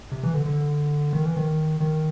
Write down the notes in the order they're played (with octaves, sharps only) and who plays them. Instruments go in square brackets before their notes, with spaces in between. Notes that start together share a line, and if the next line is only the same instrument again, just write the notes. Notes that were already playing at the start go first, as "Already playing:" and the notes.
[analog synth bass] C3
E3
D3
D3
D#3
E3
D#3
D#3